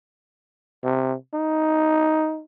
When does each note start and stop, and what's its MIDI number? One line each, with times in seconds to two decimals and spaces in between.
0.84 1.14 48
1.34 2.42 63